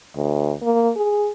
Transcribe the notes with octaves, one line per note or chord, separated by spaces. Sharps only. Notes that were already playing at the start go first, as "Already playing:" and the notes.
D2
A#3
G#4